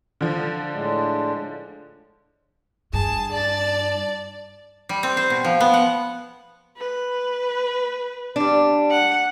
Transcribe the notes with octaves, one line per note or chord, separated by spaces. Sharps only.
D3 F3
A2 G#3 D4
G2 G#4 A5
D5 A5 A6
G3
C4
C5
B2
F3
B3
F#5
B4
G3 D4
F#5